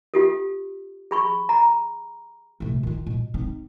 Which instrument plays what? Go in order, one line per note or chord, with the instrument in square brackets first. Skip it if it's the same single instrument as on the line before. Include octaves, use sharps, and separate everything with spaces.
[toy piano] F4 G4 A4
G#4 B5 C#6
A#5
[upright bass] D2 C3
D#3 F4
B2
C4 D#4